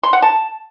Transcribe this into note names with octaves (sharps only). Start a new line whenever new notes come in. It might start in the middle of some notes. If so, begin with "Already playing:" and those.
C6
F#5
A5